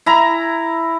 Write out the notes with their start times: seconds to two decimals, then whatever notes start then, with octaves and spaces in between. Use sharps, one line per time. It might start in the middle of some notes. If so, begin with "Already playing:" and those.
0.06 E4 A#5